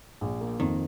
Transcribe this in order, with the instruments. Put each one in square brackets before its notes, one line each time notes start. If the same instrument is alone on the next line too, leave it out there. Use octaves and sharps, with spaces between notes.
[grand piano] A#1
A#3
[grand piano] F2 [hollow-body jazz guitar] D#3